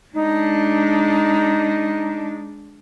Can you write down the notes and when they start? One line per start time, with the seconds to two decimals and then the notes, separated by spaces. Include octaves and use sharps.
0.14 G#3 D4 D#4